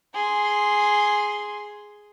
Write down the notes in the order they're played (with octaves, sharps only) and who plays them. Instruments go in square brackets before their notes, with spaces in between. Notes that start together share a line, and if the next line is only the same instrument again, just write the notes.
[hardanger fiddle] G#4 C6